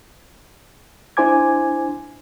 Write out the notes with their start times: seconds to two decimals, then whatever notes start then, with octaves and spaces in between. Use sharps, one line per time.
1.17 D4 E4 C5 G#5 D6 G#6